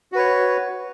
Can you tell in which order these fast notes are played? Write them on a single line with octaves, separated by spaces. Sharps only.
F#4 B4 C#5